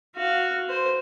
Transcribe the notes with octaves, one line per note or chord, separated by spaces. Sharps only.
F#4 F5
C5